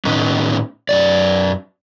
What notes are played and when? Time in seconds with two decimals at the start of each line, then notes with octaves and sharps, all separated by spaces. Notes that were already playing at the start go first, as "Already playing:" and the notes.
0.05 A2 D#3 B3 C#4 D#4
0.89 F#2 F3 D5